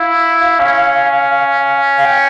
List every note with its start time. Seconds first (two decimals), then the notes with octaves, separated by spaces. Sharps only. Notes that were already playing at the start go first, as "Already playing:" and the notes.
Already playing: E4 F5
0.60 C#4
1.98 F5
2.05 G5